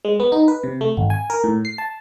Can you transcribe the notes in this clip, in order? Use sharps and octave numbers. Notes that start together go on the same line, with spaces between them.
G#3
B3
D#4
B4
C3
A3
G#1
G#5
A#4
A2
C7
A5